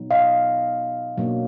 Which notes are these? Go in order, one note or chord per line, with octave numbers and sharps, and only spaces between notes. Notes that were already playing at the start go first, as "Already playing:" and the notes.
Already playing: B2 F#3 B3 D#4
D#5 F5
B2 F#3 A#3 D4